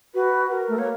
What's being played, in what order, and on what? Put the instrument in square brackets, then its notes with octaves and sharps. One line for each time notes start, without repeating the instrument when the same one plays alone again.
[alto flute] F#4 [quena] B4
[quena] B4
A#4
[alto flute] A3
[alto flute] A#3 [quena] C#5